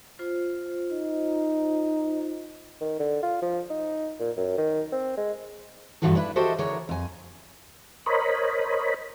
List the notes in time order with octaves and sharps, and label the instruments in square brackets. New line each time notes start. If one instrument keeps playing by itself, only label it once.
[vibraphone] F4 C5
[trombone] D#4
[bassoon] D#3
D3
F4
F3
D#4
A#2
F#2
D#3
C4
G#3
[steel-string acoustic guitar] G2 A#2 E3 F3 F#4 A4
D4 E4 B4
F#4 G4 A4 C5 D#5 E5
D3 E3 G#4 A#4 C#5
F2 G#5
[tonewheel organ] A#4 C5 C#5 D#5 B5